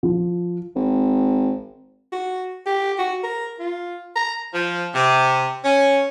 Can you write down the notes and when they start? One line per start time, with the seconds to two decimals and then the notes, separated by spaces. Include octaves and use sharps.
0.03 F3
0.75 G#1
2.13 F#4
2.66 G4
2.99 F#4
3.24 A#4
3.60 F4
4.16 A#5
4.54 F3
4.95 C3
5.64 C#4